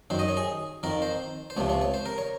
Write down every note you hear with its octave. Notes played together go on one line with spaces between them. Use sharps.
F#2 D#3 C5
D#5
C#5
G#4
F2 D#3 A#4
C5
C5
C#2 C3 F3 C#5
C#5
C#5
C5
A#4
C#5